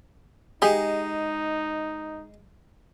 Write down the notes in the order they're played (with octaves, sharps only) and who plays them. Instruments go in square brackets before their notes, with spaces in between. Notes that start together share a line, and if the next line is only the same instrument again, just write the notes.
[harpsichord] G#3 F#5 [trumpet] D#4 [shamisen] G4 G#4